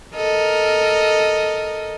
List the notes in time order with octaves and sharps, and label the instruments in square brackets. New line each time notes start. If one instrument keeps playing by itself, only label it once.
[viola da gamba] A4 A#4 D#5